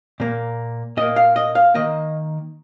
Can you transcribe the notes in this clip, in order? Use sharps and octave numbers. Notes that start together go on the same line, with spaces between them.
A#2 A#3
A#2 A#3 D#5
F5
D#5
F5
D#3 A#3 D#5